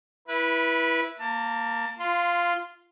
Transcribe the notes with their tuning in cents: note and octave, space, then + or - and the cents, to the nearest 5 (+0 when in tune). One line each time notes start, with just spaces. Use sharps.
E4 +0 B4 -20
A#3 +0 A5 +25
F4 -5 C6 -20